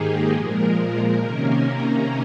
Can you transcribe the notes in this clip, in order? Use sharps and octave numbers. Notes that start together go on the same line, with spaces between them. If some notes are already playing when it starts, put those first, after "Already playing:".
Already playing: G#2 D#3 A#3 D#4 G4 G#4
A#2 F3 G#3 A#4
C3 D#3 A#3 C#4